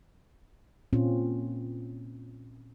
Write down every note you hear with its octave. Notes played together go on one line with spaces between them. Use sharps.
A#2 C4 C#4 F4